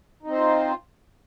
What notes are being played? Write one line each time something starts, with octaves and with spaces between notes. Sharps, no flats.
C4 D#4 F4 C5